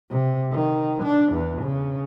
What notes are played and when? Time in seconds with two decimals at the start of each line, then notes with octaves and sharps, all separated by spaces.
0.11 C3
0.53 D#3
1.03 D4
1.33 E2
1.63 C#3